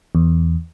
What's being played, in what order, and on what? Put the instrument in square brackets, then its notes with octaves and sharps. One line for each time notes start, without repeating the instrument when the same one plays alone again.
[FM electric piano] E2